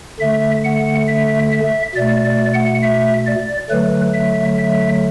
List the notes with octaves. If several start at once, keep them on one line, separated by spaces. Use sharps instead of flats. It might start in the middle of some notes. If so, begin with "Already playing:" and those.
D3 A3 E5
F#5
E5
E5
B2 A3 D5
D5
F#5
E5
D5
D3 F#3 A3 B4
E5
E5